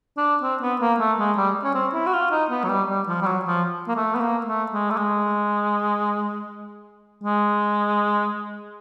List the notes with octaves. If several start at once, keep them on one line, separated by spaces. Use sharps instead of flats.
D4
C4
B3
A#3
A3
G#3
G3
C#4
C4
E4
F#4
F4
D#4
B3
F#3
G3
G3
F3
G3
F#3
F3
A#3
A3
B3
A#3
A3
G#3
A3
G#3
G#3